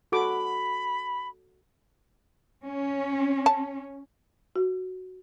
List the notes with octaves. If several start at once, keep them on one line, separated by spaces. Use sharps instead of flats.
F#4 A4 B5 D6
C#4
A5
F#4